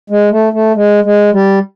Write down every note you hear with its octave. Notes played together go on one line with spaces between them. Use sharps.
G#3
A3
A3
G#3
G#3
G3